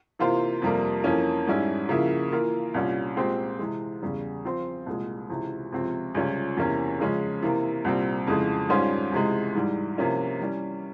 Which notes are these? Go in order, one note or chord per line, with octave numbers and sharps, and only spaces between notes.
C3 E3 A#3 F4 C5
F2 C3 G3 A#3
F2 E3 A#3 C#4
G#2 G3 C#4 E4
C#3 F3 A#3 E4
E3 A#3 F4 A#4
C2 A#2 G3 C#4 F4
A#2 G#3 C4 G4 C5
C3 E3 G#3
E2 C#3 G3
F3 C4 F4 C5
C2 A#2 G#3
C#2 C3 E3
C#2 C3 F3 C4
C#2 C3 G3 C#4 F4
E2 C3 E3 A#3 C#4
C#3 F3 G#3 C#4
C3 E3 A#3
C2 A#2 G3 C4
F2 C#3 E3 G#3
G#2 G3 C#4 F4 C5
C#2 C3 E3 G#3
G#2 E3 G3
C3 F3 A#3 C#4 E4
E3 G3 C#4